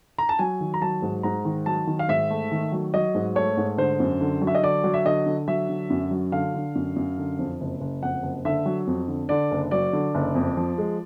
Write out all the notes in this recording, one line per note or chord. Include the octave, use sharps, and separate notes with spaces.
A#5
A5
F#3 G#5
D#3
A#5
F#3 A5
G#2
G#2 A#5
D#3
F#3 A5
D#3
F5
G#2 E5
A3
D#3
F#3
F#3 D#5
G#2
A3 C#5
G#2
D3 C5
F#2
D3
F#3
E5
D#5
D3 D5
F#3
E5
D3 D#5
D3
F#3 E5
D3
F#2
F#3
D3 F5
D3
F#2
F#2
D3
F2
F#1
F#1
F2 F#5
F#1
D3 E5
F#3
F2
D3
D3 D5
F#1
F#3 D5
D3
F#1
F2
F3
G#3